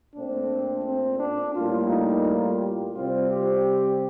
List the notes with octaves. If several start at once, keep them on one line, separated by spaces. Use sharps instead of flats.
A#2 A3 C4 D4
C4
D4
A2 G3 A#3 F4
D#4
F4
G4
C3 G3 C4 F4
G4